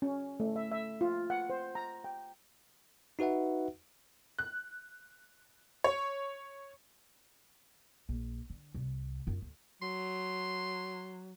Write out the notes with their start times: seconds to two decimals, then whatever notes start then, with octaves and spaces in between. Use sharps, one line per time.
0.02 C#4
0.40 A3
0.56 E5
0.72 E5
1.01 F4
1.30 F#5
1.50 C5
1.75 A#5
2.04 G5
3.19 D#4 F#4 B4 E5 F#5
4.39 F#6
5.84 C#5
8.09 A#1
8.50 D3
8.74 C2 C3
9.27 F#2 F4
9.42 D2
9.82 F#3 C6